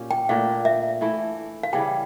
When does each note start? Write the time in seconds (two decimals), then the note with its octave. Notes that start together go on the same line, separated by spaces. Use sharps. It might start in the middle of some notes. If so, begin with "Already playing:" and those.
Already playing: A#2 C#4 G4
0.11 G5
0.29 A#2 A3 D4 F5
0.65 E5
1.01 E3 A3 E4
1.63 F5
1.73 C#3 E3 G3 G5